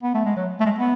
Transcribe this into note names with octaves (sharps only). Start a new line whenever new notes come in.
B3
A3
G#3
F#3
A3
G#3
B3